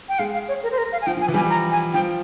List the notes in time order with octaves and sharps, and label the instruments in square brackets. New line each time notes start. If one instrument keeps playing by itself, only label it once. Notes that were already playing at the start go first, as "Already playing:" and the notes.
[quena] G5
[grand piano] G#3 [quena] F5
[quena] F5
C#5
A#4
C5
A#4
F5
G#5
[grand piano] F3 [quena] G5
[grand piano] F3
[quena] G#5
[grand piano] E3
[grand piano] G3 [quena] G#5
[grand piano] F3
[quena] A#5
G#5
[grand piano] F3 [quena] G5